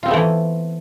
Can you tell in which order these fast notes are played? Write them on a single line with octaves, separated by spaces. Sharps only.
F4 C4 B3 A3 E3